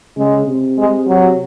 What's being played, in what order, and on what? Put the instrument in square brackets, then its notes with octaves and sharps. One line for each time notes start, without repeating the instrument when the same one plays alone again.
[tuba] C#3 [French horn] G#3
[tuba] C3
[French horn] G#3
F#3